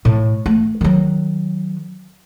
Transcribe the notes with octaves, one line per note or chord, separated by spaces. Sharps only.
A2
A3
D#3 F#3